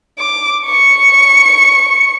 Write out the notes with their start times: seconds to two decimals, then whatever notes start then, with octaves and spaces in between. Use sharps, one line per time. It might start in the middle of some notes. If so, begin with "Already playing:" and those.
0.19 D6
0.66 C#6 C#7